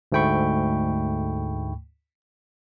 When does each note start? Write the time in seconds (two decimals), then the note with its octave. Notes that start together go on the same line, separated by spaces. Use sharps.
0.12 D2 G#2 A3 G5 B5 C#6